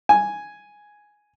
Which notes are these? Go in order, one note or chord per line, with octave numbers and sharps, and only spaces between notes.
G#5